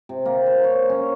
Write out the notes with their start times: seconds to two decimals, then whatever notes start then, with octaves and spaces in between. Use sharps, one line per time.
0.09 C3
0.26 A#3
0.46 C5
0.64 C#5
0.89 C#4